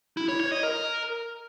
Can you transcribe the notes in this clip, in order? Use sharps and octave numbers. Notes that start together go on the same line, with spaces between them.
E4
C#5
C#5
D#5
A#4